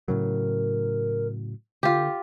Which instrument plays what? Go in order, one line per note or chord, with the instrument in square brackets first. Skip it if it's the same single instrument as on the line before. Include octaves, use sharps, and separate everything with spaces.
[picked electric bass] A2 C#3 F#3 [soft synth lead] A#4
[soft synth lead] D3 [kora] F4 G4